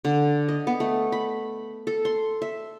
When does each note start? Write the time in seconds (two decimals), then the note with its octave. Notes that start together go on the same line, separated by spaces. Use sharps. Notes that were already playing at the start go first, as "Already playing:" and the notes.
0.05 D3
0.48 D#5
0.67 B3
0.80 A3
1.12 B5
1.87 A4
2.05 C6
2.42 E5